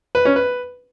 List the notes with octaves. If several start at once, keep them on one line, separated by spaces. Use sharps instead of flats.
B4
C#4
B4